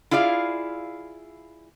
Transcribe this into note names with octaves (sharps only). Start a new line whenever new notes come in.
E4 F4 G#4 D5 F5